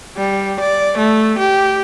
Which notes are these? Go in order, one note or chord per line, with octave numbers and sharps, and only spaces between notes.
G3
D5
A3
G4